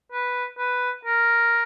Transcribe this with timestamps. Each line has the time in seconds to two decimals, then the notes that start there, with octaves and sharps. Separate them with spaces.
0.12 B4
0.58 B4
1.05 A#4